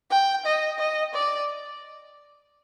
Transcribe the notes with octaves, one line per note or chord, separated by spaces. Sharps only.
G5
D#5
D#5
D5